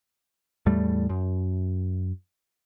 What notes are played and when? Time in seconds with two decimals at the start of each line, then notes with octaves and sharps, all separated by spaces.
0.66 E2 A2 G3 A3
1.09 F#2